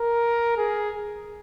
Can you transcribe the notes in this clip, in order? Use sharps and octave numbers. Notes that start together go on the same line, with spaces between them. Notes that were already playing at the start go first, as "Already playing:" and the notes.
Already playing: A#4
G#4